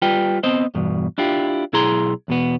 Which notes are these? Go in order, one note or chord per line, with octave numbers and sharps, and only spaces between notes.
G3 F4 B4 G5
B3 C4 C5 D#5
E2 G2 B2
D4 E4 F4 G4
B1 E4 G#4 A#5 C6
E2 B2 B3